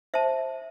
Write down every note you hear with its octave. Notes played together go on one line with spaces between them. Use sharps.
C5 E5 A5